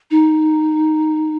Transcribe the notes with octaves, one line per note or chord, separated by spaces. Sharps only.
D#4